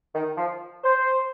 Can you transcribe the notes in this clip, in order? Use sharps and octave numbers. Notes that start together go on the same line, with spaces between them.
D#3
F3
C5